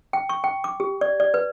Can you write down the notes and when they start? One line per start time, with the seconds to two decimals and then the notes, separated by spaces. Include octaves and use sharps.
0.13 G5
0.29 C#6
0.44 G5
0.64 D6
0.80 G4
1.01 D5
1.20 D5
1.34 B4